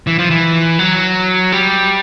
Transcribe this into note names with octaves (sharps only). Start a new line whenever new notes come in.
E3
F3
E3
F#3
G3